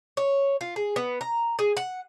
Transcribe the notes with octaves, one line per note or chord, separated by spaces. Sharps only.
C#5
F4
G#4
B3
A#5
G#4
F#5